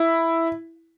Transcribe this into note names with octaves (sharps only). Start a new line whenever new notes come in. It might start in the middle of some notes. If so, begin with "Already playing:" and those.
Already playing: E4